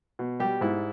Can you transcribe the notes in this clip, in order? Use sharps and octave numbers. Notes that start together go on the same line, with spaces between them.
B2
G3 G4
G#2 E4